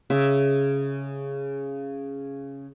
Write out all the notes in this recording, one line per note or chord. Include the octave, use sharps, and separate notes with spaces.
C#3 E5